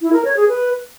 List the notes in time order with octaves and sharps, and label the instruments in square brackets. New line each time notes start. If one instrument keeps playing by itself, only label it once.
[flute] E4
A#4
C#5
G#4
B4